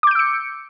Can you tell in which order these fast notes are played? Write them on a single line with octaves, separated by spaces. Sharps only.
D6 G6 D7 E6 C#7